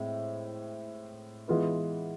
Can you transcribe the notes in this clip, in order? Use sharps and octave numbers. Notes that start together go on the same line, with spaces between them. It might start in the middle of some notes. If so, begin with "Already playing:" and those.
Already playing: A2 G#3 C4
E3 G#3 B3 F4 B4